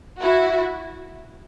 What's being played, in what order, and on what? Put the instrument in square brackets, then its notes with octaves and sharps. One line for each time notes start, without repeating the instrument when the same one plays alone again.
[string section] E4 F#4